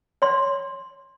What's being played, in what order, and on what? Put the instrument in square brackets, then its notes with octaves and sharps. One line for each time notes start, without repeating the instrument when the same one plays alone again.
[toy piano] C#5 C6